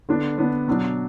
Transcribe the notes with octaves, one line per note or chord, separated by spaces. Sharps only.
D3 B3 D4
D3 B3 D4
B2 F#3 D4